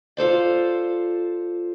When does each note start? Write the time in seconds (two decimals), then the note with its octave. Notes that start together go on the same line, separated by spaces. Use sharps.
0.17 F4 A4 C5 D5